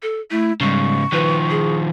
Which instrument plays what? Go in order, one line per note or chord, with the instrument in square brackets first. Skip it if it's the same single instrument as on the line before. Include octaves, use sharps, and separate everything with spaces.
[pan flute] A4
[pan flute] A3 [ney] E4
[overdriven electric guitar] G#2 C#3 [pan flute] G3 [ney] C#6
[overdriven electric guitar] D#3 F3 [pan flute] B4
[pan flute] G#4